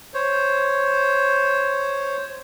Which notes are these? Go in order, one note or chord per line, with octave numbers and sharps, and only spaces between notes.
C5 C#5